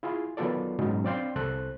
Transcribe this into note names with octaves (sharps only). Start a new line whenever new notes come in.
E4 F4 G#4
D#3 F#3 B3 F4 A4 D5
G#2 B2 F#3 C#4 D#4
C4 D4 D5 F5 G5 C6
C2 A4 C5 F#6